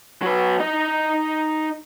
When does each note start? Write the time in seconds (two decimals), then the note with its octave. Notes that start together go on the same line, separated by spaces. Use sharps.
0.22 F#3 B4
0.60 D#4 D#5